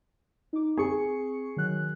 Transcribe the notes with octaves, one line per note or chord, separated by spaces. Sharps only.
D#4 D6
C4 G#4 C#6 C#7
D#3 F#3 F#6